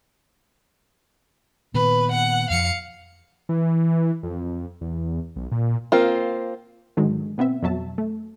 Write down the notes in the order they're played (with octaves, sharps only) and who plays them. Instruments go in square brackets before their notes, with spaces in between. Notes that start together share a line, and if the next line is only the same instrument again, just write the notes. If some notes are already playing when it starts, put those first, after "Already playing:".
[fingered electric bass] A#2 D#3 B3 [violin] B4
[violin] F#5
[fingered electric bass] F2 F3 [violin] F5 C#7
[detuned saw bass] E3
F2
E2
B1
A#2
[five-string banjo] A#3 C4 F4
[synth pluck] G#2 D3 D#3 F#3 G#3
B2 B3 C4 E5
F2 B2 F#3 E5 A5
A3